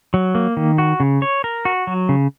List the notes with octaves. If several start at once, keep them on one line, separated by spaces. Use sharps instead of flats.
F#3
A#3
D#3
F#4
C#3
C#5
A#4
F#4
F#3
C#3